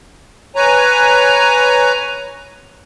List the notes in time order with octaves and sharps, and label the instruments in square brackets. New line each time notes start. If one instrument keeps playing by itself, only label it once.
[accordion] B4 C#5 G#5 A#5